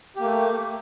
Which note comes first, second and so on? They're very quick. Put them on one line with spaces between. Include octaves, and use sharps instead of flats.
G4 A#3 A3